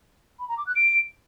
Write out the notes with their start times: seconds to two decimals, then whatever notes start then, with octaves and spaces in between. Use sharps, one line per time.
0.39 B5
0.48 A#5
0.57 D6
0.67 F#6
0.76 D7